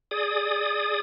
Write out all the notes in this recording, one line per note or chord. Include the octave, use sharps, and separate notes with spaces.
G#4 D5 D#6